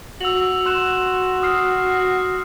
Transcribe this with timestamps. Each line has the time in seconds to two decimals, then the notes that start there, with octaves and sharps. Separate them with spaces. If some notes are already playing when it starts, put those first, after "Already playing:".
0.21 F#4 E6 F7 F#7
0.66 C6 F#6 E7
1.42 D#6 F6 C7